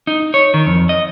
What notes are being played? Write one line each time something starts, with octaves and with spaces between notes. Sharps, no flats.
D#4
C#5
D#3
F2
D#5